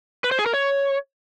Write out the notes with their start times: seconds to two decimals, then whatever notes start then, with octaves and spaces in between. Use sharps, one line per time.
0.24 B4
0.31 C5
0.39 G#4
0.46 A#4
0.54 C#5